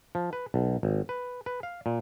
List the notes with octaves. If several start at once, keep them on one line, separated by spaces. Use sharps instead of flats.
F3
B4
B1
G#1
B4
B4
F5
A#2